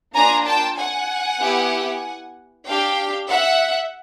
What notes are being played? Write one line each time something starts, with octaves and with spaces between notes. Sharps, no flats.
A#3 D4 F4 G#5 A#5
G5 A5
F#5 G#5
B3 E4 G4
D4 G4 F5 G5
E5 F#5